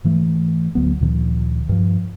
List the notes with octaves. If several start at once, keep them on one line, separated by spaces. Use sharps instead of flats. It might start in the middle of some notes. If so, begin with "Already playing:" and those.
G#2 E3 A3
D2 F#3 B3
D2 A#2 D#3 F3
G2 F3